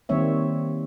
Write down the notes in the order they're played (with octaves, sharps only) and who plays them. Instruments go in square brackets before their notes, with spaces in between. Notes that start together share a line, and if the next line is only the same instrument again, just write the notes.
[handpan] D#3 G3 A#3 C4 C#5 E5